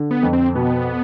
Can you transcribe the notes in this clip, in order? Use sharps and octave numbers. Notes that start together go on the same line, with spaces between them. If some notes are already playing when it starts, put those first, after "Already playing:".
Already playing: D3
B3
F2
C4
B2 B3